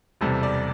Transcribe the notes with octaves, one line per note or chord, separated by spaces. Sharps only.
E1 E2 C3 G3 A4
D5